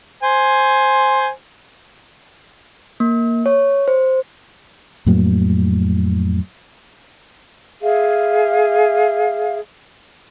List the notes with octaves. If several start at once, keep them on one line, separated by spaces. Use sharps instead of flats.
C5 G#5
A#3
C#5
C5
F2 A2 F#3 A#3
G#4 E5 F5